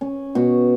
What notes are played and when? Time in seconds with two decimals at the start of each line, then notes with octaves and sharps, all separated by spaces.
0.01 C#4
0.35 B2 F#4